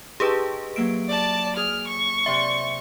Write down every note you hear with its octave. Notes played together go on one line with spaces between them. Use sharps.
D#4 G4 G#4 B4 G5 A5
F#3 A#3 E5 D7
D5 A5
G#4 F6
C#6
C3 D5 E5 C6